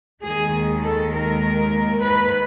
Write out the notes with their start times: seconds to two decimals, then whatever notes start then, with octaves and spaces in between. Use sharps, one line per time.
0.24 D#2 D#3 G#3 G#4
0.84 A4
1.14 A#4
2.05 B4